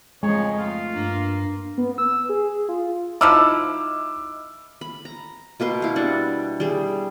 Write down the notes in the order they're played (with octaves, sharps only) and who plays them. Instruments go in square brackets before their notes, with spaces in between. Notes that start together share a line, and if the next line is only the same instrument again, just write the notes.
[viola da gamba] F2 F3 D#4 [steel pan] G#3 [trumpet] C#5
[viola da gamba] A3 [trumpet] F4
[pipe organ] G2 [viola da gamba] A#3
[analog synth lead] B3
E6
G#4
F4
[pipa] F3 D#4 E4 [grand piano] D6 E6 F6
[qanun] B5
A#5
B2 A#3 B4 C6
E4 F5
G3 D4 F#5
G3 G#4